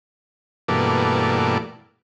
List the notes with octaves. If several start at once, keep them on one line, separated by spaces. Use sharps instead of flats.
G2 B2 E3 A3 A#3 D5